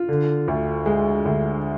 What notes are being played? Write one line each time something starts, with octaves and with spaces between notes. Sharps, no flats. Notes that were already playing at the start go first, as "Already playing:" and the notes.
Already playing: F4
D3
D2
G#3
D2